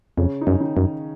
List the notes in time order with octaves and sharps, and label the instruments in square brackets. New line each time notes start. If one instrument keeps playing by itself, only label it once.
[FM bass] F2 [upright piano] C#3 C#4
[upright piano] D#4
[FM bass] F#2 [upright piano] C#4
[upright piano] D#3 D#4
[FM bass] F#2